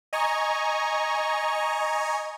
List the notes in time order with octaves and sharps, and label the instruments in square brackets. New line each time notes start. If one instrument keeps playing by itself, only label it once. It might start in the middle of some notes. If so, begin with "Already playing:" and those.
[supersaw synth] D#5 G#5 A#5 C#6